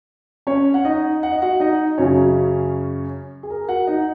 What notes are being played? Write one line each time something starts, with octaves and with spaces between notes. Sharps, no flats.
C#4 C#5
F#5
D#4 D#5
F#5
D#5
F#4 F#5
D#4 D#5
F#2 C#3 C#4 C#5
G#4
A#4
F#4 F#5
D#4 D#5